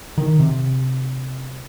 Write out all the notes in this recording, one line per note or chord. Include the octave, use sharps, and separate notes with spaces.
D#3
C3